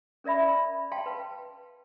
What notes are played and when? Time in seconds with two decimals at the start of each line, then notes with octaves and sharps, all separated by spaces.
0.24 C#4 A#4 D5 E5 B5
0.92 F5 G5 A5 C6
1.06 B4